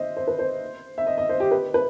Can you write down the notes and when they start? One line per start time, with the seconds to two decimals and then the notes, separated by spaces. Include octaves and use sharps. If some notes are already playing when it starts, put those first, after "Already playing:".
Already playing: C5 D#5 E5
0.17 C5
0.27 B4
0.39 C5
0.98 E5
1.07 D#5
1.18 D#5
1.29 C5
1.40 G4
1.51 B4
1.74 B4